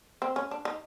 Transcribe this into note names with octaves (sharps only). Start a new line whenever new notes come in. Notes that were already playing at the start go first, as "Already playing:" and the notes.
C4
C#4
D4
D#4